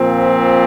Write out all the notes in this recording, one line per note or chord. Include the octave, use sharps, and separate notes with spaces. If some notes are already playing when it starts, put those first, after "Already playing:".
Already playing: A#2 F3 C4